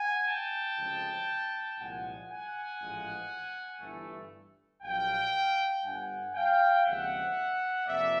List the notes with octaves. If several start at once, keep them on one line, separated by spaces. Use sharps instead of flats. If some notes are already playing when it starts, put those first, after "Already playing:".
Already playing: F#5 G#5
G5 A5
D2 C#3 F3 G#3 C4
C2 A#2 F3 G#3 F#5 G#5
F#5 G#5
A1 G#2 F3 G#3
G1 G2 E3 A3
A#1 A#2 F#3 F5 G5
G1 G2 D3 F#5 G#5
F5 G5
D#2 C#3 F3 G#3 C4 E5 F#5
F2 C3 F3 A#3 D5 E5